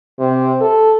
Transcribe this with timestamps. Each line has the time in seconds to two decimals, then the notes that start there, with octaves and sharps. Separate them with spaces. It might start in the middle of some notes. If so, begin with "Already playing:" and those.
0.19 C3
0.61 A4